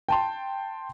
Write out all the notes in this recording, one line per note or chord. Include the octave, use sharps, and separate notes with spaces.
G5 A5 C6